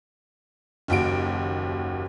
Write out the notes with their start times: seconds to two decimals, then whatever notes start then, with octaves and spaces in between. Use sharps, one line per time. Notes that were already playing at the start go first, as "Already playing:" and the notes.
0.88 F#1 D#2 F#4 D7